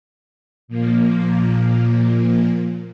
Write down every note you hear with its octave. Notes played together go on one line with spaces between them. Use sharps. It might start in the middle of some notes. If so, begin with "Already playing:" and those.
A#2 F3 A#3